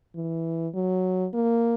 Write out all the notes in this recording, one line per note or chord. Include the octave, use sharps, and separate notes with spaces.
E3
F#3
A#3